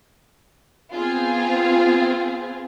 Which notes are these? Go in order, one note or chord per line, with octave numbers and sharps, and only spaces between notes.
B3 C4 F4 G#4